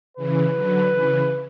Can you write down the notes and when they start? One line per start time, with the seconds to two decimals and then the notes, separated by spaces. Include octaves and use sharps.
0.17 C#3 E3 B4
0.54 D3 F#3
0.92 C#3 E3